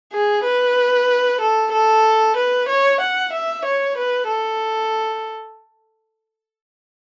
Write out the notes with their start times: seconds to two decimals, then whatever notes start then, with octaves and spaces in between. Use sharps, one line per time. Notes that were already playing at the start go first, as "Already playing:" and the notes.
0.13 G#4
0.44 B4
1.40 A4
1.72 A4
2.36 B4
2.68 C#5
3.00 F#5
3.32 E5
3.65 C#5
3.97 B4
4.29 A4